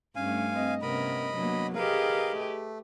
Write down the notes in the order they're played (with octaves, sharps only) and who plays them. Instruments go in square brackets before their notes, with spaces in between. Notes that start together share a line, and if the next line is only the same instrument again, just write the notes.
[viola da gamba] G2 A3 [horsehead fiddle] C#4 [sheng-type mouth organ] F5 G#5
[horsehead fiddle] C4 D#5
[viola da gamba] C3 A#4 [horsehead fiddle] B3 C#4 [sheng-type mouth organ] D#5 B5
[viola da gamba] F#3 A#3 [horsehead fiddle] B3 D4
[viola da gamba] G4 B4 [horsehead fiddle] G#4 D#5 [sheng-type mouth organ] A#4 F5
[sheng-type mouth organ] A3